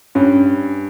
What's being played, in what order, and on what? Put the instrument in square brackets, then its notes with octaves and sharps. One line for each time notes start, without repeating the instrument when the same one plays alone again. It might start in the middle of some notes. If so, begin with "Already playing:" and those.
[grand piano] G2 [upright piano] C#4